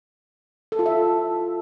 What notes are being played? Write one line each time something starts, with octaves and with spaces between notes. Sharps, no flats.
A4
F4
E5